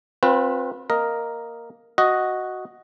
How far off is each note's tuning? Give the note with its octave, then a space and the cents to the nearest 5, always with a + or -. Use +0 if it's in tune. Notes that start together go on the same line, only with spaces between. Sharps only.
C4 +20 F4 +40 B4 +0
A#3 +0 A#4 +0 D#5 +0
F#4 +0 D#5 +0